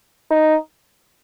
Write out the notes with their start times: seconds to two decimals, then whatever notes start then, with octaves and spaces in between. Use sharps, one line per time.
0.31 D#4